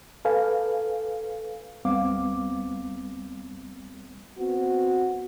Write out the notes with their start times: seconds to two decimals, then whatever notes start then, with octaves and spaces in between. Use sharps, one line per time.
0.25 A4 B4 F5 G#5
1.85 D2 G3 B3 C4 F5 D6
4.38 B3 C4 F#4